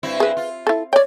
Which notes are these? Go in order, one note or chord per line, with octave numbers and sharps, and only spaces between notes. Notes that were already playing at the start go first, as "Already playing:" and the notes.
G2 C4 E4
G#4 B4
F4
E4 A4
C#5 D5 G5